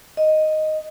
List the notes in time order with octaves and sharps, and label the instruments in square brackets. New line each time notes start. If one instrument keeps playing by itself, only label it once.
[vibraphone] D#5